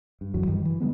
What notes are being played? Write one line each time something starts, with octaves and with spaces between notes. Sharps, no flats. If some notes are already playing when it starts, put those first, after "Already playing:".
G2
G1 E2 E3 F#3
G2 D#3 E3 G3
E3
D3 G3 G#3 B3